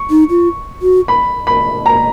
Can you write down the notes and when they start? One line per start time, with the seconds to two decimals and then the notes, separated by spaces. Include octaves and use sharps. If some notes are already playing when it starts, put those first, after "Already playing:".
Already playing: C#6
0.10 D#4
0.30 F4
0.82 F#4
1.08 B5
1.47 B5
1.86 A#5